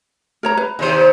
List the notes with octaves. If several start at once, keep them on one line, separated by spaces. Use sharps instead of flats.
A#4 C#5 A#5
B4
D#2 C3 C5